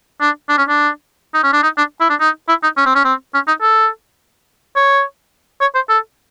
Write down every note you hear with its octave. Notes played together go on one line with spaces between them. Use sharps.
D4
D4
C#4
D4
D#4
C#4
D4
D#4
D4
E4
D4
D#4
E4
D#4
C#4
C4
C#4
C4
C#4
D#4
A4
C#5
C#5
C5
A4